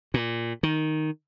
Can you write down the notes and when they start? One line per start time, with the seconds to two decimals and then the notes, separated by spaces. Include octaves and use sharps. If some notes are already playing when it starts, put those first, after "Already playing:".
0.14 A#2
0.63 D#3